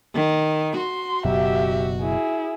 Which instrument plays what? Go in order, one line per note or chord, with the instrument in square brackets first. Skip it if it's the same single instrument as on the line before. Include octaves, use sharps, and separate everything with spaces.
[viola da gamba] D#3
[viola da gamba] F#4 [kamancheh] C6
[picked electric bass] F#1 B2 F#3 [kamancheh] G4 E5
[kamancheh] E4 G#4